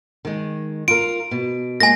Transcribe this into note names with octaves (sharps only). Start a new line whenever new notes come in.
D#3 G#3
F4 A#4 D7
B2
G#3 A#3 G#5 A#6